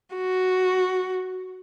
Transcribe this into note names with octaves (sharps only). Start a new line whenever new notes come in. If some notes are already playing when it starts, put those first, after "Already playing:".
F#4